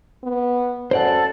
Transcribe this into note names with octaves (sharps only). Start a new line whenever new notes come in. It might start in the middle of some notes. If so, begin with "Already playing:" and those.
B3
F#2 A4 C5 D5 F#5